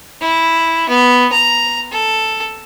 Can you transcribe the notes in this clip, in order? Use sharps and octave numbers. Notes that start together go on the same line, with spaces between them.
E4
B3
A#5
A4